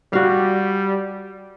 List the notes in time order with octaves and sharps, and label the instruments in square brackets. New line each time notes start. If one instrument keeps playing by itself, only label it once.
[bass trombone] G3 [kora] F#4 F5